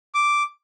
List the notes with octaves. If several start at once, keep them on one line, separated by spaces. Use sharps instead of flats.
D6